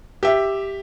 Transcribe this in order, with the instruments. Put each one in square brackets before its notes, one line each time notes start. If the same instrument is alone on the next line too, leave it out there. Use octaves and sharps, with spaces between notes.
[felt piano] G4 E5